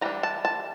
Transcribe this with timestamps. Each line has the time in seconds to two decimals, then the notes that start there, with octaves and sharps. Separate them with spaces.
0.01 E3 G3 D4 A#5
0.23 A5
0.45 A5